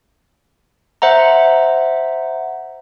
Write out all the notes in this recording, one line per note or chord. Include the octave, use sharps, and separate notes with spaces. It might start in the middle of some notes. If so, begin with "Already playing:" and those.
C5 E5 F#5 A#5